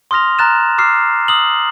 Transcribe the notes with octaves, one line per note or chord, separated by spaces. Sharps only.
C6 D#6 F6 A#6 F7
A#5 F6 F#6 A6 E7
D6 E6 F6 C7
D#6 E6 F#7